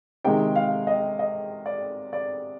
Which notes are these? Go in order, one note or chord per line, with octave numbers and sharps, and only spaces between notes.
C3 D#3 G#3 G5
F5
D#5
D#5
D5
D5